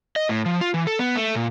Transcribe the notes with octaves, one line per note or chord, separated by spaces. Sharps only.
D#5
A2
F3
F4
E3
A4
B3
A3
A#2